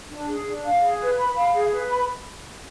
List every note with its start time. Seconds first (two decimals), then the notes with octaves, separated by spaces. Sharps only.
0.10 D4
0.27 G#4
0.46 D4
0.64 F5
0.82 G#4
1.00 B4
1.18 B5
1.36 F5
1.54 G#4
1.72 B4
1.90 B5